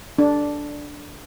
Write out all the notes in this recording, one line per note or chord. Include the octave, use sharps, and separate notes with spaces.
D4